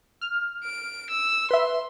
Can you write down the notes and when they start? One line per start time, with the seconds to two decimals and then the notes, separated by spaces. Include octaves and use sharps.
0.21 F6
0.64 D7
1.10 E6
1.51 B4 E5 C6